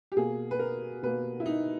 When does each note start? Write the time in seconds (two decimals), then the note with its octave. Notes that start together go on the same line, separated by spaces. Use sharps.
0.12 G4
0.17 B2 A#3 G#4
0.51 B4
0.59 A#4
1.03 B2 A#3 B4
1.40 E4
1.46 D#4